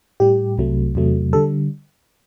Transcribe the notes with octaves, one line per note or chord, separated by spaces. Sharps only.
A2 G3 G4
C2 C3 F#3 A3
E2 C3 F#3 A3
D3 G3 A4